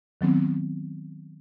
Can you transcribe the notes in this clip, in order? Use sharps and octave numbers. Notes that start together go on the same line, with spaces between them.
D#3 F#3 B3 C4